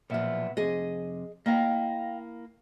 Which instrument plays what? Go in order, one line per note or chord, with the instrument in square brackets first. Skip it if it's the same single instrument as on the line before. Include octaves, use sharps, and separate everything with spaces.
[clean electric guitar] B1 B3 E5 [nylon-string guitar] A#2 F3
[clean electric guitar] F2 C3 [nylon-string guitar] G#4 D#5
[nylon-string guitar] A#3 E4 [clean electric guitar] D#5 F5 G5